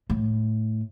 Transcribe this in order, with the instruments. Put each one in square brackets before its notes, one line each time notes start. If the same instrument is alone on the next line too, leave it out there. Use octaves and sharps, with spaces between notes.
[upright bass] A2